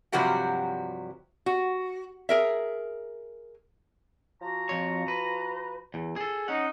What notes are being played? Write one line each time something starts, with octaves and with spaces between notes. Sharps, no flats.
G2 C3 F3 F#3 F#4 G4
F#4
G#4 A#4 E5
F3 F#4 A#5
F2 C#5
B4
E2
G#4 A4
C#4 D#4 F#5